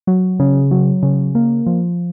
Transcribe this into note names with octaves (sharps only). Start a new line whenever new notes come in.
F#3
C#3
F#3
C#3
A#3
F3